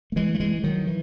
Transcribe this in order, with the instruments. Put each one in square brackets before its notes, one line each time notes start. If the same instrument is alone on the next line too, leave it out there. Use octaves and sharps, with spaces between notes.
[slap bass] A3
E3 G#3
A3
E3 G#3
D#3 F#3
E3